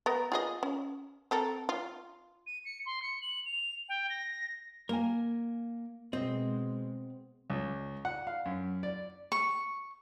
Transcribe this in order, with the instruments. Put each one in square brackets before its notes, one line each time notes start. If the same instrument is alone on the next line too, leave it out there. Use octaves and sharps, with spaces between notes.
[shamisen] B3 A#4
F4 G#4 D#5
C#4
C4 A4 A#4
F4
[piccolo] D#7
C#7
C6
C#7
F#7
F7
G5
A#6
[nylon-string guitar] A#3 G#5 [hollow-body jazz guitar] A#4
[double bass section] B2 G#3 [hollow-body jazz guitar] C4 [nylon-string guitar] D#5
[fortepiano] C#2
F#5
F5
F#2
D5
[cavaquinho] C#6